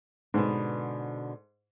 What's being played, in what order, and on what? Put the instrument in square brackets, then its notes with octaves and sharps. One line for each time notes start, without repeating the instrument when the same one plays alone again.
[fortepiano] G#2 [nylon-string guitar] B2 D3